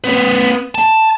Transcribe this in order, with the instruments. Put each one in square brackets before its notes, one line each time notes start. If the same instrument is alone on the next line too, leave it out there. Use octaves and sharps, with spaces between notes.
[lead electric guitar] C4 B4
A5